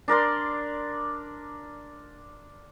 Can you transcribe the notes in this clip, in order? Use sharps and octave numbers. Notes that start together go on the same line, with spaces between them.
D4 A#4 D5 C6